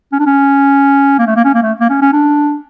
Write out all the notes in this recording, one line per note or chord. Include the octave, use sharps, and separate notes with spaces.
C#4
D4
C#4
A#3
A3
A#3
C#4
A#3
A3
A#3
C#4
C#4
D4